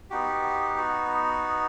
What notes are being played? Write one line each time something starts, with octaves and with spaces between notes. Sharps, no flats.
B3 D#4 F#4 G4
F#4